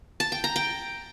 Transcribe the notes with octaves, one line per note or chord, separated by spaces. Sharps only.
A5
G5
A#5
G5